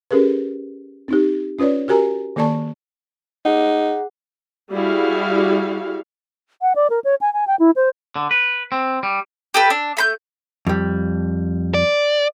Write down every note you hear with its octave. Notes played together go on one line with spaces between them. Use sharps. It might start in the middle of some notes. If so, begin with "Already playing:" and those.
C#4 G4 G#4 A#4 B4
C4 D#4 G4
C#4 F4 B4 C#5 D5
F#4 G4 A#4 G#5 A#5
D#3 A#3 A4 D5 A5 C#6
D#4 G#4 F#5
G3 E4 F#4 G#4 F5
F#5
D5
A#4
C#5
G#5
G#5
G5
E4
C5
D3
B4
C4
G3
G4 A4 B4
D4
A3 B5 G6
F2 G3
D5